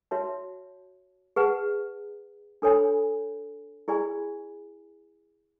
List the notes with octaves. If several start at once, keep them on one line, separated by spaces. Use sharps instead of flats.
F#4 C#5 E5 A5
G#4 B4 F#5 A5
D4 A4 C#5 G#5 B5
E4 G#4 D5 G#5 B5